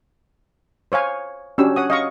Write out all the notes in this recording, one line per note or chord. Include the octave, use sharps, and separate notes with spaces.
C5 C#5 F5 G#5
C#4 D4 F#4 G4 E6
C#5 F#5 D#6
D#5 F5 C#6